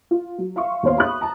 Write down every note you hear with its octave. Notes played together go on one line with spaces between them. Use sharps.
F4
F#3
E5 F5 C6 C#6
D#2 B3 C5 C#5 F5 C6
E5 B5 C#6 D#6 F#6
A5 A#5